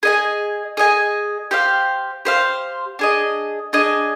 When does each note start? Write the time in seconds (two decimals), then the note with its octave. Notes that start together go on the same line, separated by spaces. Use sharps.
0.03 G#4 D#5 G#5
0.77 G#4 D#5 G#5
1.51 G4 C5 F5
2.25 G4 C5 F5
2.99 D4 G#4 D#5
3.73 D4 G#4 D#5